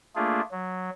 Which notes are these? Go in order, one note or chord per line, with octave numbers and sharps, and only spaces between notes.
A3 A#3 D4 F4 G#4
F#3